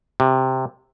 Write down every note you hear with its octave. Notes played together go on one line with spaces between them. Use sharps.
C3